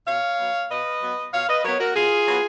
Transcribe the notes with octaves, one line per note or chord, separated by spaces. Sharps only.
B2 C#5 F5
F#3 B3
B2 B4 D#5
F#3 B3
B2 C#5 F5
B4 D#5
F#3 B3 A#4 C#5
F#4 A#4
B2 F4 G#4
F#3 B3